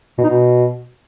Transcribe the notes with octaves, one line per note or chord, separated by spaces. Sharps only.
B2
D#4
B2